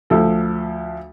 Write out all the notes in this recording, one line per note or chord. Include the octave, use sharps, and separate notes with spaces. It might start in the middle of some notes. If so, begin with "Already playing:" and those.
D2 F3 A4